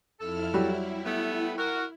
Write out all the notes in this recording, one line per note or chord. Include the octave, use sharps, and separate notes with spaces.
F2 E4 A4 F6
F#3 G3 E4
A3 B3
F#4 A#4